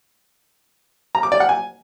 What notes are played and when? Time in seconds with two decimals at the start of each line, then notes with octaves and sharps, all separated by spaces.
1.15 A#5
1.23 D6
1.32 D5
1.40 F#5
1.49 G#5